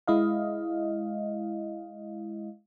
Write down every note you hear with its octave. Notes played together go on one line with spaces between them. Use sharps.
G#3 E4 D#5 F5